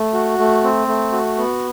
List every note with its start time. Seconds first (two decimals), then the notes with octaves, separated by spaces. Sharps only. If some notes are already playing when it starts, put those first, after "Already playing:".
Already playing: A3
0.13 F#4
0.39 A3
0.63 C4
0.88 A3
1.12 F#4
1.38 B3